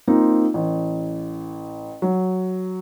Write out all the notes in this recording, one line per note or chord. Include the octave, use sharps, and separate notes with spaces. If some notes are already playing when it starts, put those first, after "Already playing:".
A#3 C4 D#4 F4
A1
F#3